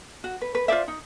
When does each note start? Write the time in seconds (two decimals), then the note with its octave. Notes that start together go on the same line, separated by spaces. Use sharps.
0.24 F#4
0.42 B4
0.55 B4
0.68 F4 C5 D5 E5
0.88 D#4